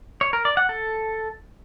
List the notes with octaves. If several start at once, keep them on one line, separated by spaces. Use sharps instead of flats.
C#5
A#4
D5
F#5
A4